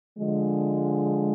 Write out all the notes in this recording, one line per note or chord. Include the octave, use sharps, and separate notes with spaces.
D3 F3 G#3